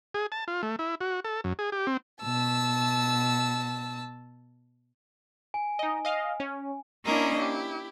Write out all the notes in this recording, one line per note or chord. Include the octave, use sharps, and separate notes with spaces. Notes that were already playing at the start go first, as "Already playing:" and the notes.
G#4
A5
F4
A3
E4
F#4
A4
F#2
G#4
G4
C4
B2 A5 E6
G#5
D#4 D#5
D#5 F5
C#4
A#3 C#4 D4 E4 A#4 D#5
E4 G4